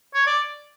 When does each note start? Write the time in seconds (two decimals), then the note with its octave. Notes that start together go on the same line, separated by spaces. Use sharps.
0.14 C#5
0.27 D5